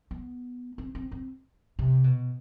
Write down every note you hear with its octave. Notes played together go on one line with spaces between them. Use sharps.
B3
C4
C4
C4
C3
B2